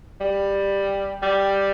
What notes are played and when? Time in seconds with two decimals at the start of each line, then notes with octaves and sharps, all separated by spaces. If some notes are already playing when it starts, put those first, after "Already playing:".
0.21 G3
1.22 G3